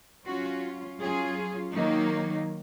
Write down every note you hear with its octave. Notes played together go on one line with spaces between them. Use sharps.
F#3 C#4 F4 F#4
F#3 C#4 F4 G#4
D#3 F#3 A#3 D#4